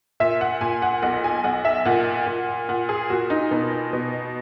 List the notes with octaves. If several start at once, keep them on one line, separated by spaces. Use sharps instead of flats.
A#2 E5
F#5
A#2 G#5
F#5
B1 F#5
G#5
B1 F#5
E5
A#2 F#5
A#2
A#2 F#5
G#4
A#2 F#4
D#4
B2 D#4
B2